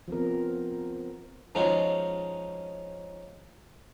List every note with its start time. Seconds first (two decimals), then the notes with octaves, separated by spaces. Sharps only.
0.08 F3 B3 C4 A#4
1.55 F3 G#3 C#4 D#4 F#4